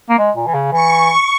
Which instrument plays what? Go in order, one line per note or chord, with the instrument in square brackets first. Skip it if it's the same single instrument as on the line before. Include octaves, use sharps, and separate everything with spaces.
[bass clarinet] A#3
G#3
A#2
E3
C#3
[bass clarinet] E3 [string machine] C#6